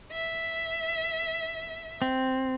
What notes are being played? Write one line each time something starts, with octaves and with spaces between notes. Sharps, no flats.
E5
C4